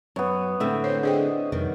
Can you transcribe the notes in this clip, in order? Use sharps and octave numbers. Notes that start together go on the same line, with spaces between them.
F#2 B3 C#5
A2 D3 C4 E5 G5
C5 C#5 G5 C6
D4 G#4 C5 D#5 G5
F2 C3 D#3 G3